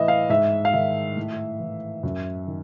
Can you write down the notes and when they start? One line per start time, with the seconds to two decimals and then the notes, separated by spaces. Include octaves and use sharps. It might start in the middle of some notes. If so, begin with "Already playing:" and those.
Already playing: A2 E3 D#5 E5
0.08 F5
0.29 G#2 E5
0.65 F5
0.73 D#3 E5
1.17 A2
1.60 E3
2.03 F#2
2.47 D#3